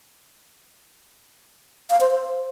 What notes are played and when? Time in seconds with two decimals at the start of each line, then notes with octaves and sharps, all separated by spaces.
1.90 F5
2.01 C5
2.11 C5